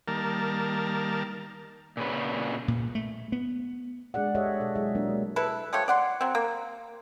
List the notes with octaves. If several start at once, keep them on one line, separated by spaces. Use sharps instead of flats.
D#3 G3 A#3 A#4 A5
A#2 C#3 B4
A#2
A3
B3
G#3 D4 G#4 D5 F#5
G4 A4 C#5 D#5 E5
B2 A4
F#3 G#3 E4 G#4 E5
F#3 A#3 D4 A#4
G#3
E4 A4 B4
F3 A3 G4 C#5
D5 F#5 C6
F#3 C4
A#3